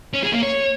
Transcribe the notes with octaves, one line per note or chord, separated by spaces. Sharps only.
C#4
G#4
A#3
C#5